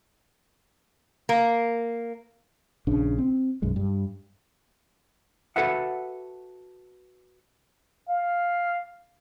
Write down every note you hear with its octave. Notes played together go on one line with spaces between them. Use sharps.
A#3
A#1 C#3 D4
C4
B1 F#2 G#3
G2
F#4 A4 B4 E5 F#5
F5